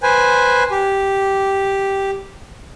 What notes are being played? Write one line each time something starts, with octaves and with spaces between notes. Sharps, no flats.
B4 C5 G#5
G4